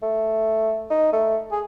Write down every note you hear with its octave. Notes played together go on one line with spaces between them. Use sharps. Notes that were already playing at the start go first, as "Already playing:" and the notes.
A3
D#4
A3
G#4